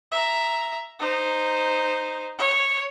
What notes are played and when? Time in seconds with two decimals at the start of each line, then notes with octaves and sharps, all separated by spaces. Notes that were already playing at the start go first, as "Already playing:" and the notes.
0.12 E5 A#5
0.99 D#4 C5
2.39 C#5